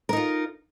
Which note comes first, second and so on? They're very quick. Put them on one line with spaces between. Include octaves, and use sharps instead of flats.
A#4 D#4 F4